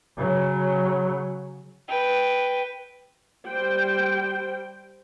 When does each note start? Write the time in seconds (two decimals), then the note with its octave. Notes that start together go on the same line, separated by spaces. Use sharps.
0.17 C#3 F#3
1.89 B4 G5
3.47 G3 C5 G5